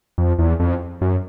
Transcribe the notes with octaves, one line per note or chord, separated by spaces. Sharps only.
F2
E2
F2
F#2